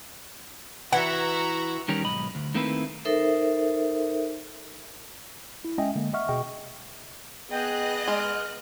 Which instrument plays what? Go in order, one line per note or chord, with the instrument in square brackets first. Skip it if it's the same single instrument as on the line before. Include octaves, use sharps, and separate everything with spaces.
[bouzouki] E3 [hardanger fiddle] F#4 [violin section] E5 A#5 [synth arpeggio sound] F#5
[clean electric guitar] D#3 G3 C#4 G4 A#4
B1 G#2 D#5 B5
D2
D#3 A3 A#3 C4 E4 B4
[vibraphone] D#4 A4 A#4 C5 E5
[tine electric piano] E4
G#3 C#4 D#5 E5 G5 G#5
D3 G#3 A#3
D#5 E5 F#5 C#6 F6
B2 G#4 D#5 G5 C#6
[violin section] B3 D#5 F#6 [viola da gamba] G#4 [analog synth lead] G5
[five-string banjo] G#3 [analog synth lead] F6